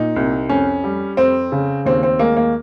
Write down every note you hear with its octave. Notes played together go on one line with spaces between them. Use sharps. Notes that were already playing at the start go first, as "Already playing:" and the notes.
Already playing: A#2 D#4
C2
F2 C#4
G3
F2 C4
C#3
D#2 C4
C4
G#3 A#3
A#3